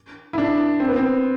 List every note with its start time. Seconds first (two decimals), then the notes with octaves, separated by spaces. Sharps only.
0.33 E4
0.38 D4
0.80 C4
0.89 B3
0.96 C4